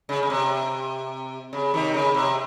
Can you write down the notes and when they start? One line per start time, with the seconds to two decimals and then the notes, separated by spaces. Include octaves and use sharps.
0.09 C#3
0.23 C#3
0.30 C3
1.53 C#3
1.74 C3 D#3
1.94 C#3
2.14 C3